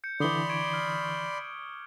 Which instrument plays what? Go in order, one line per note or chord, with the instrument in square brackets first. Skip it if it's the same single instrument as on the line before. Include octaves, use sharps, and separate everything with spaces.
[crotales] G6 C#7
[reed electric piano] D3 E3 [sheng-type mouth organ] D5 B5 C6 [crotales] D6 D#6 G7
[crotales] C#6 G#6 D7
F6